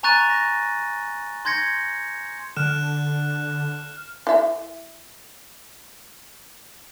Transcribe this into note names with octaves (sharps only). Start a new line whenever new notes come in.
G#5 A#5 C#6 F#6 A6 D#7
A#6
C6 G6 G#6 A#6 C#7
D3 F6 F#6 E7
E4 E5